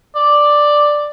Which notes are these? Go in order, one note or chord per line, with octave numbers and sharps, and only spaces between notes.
D5